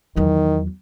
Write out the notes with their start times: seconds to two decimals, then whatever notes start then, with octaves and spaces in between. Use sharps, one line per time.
0.16 E2 D#3 F#3